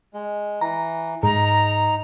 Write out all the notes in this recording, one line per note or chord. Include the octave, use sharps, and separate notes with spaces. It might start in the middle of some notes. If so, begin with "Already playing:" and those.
G#3
E3 A#5
G#2 D#4 A#5